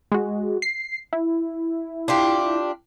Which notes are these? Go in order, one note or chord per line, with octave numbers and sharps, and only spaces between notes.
G#3 F#4
C7
E4
D4 F4 G4